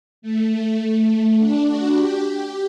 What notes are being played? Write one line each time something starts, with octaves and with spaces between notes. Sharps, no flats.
A3
A3
A3
D4
F#4
G4
G4